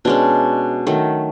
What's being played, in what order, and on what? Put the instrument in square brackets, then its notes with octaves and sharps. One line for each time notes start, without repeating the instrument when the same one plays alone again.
[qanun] B2 G#3 C#4 D4
D#3 F#3 A3